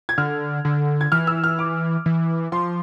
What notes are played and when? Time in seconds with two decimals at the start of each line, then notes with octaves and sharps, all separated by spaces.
0.09 G#6
0.18 D3 F6
0.65 D3
1.01 G#6
1.12 E3 F6
1.27 E6
1.44 F6
1.59 D6
2.06 E3
2.52 F3 C6